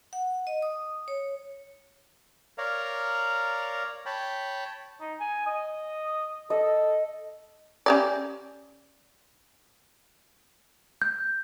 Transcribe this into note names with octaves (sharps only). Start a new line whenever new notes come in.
F#5
D#5
D#6
C#5
A#4 C#5 D5 F5 A#5
C#5 G5 A5 B5
D#4
G#5
D#5
A4 D#5
C#4 G4 D5
G6